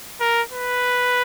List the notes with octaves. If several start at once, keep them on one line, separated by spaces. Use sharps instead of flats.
A#4
B4